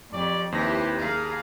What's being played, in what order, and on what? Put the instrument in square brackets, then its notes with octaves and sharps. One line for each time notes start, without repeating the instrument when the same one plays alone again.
[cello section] F2 [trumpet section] G4 C#5 D5
[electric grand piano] D#2 A#6 [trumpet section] C4 B4 C5 [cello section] E4 G4
[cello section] G#4 F5 [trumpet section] A#4 A#5